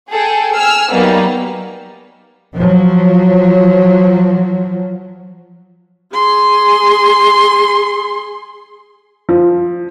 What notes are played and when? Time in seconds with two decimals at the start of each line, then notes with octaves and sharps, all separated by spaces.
0.11 G#4 A4 G5 G#5
0.55 G#5 E6 F6
0.91 F#3 G3 A#3 B3 D#4
2.56 F3 F#3
6.14 G#4 C6
9.29 F3